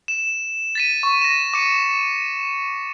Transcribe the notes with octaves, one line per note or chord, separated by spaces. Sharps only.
E7
A6 B6 D#7
C#6
A#6 E7
D6 C#7 D#7